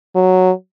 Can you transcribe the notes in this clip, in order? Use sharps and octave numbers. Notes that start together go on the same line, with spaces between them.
F#3